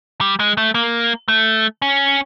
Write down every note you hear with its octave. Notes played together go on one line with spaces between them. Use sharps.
G3
G#3
A3
A#3
A3
C#4